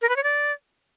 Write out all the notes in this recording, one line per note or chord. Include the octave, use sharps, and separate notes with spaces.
A#4
B4
C#5
D5